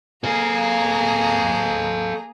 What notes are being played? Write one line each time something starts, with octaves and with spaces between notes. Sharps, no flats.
A#3 G#4 A4 F5 A#5